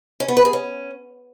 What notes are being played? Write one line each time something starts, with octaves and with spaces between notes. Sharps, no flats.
C#4
B3
B4
G#4
C#4